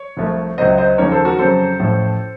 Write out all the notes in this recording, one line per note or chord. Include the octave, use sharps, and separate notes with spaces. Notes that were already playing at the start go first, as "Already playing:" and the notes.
Already playing: C#5
C2 C3 F3 A3
C#2 C3 F#3 C4 C5 D#5
C5 D#5
D#2 C#3 F3 A#3 A#4 C#5
A4 C5
F#4 A#4
F2 C#3 F#3 A4 C5
A1 A2 F3